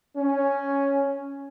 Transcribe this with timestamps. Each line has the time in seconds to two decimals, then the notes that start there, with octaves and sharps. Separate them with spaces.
0.16 C#4